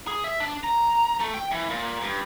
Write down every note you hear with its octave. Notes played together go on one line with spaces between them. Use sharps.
G#4
E5
D4
A#5
A3
G5
E3
A#2
G2